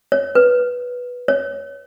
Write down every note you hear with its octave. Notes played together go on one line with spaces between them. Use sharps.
C#5
B4
C#5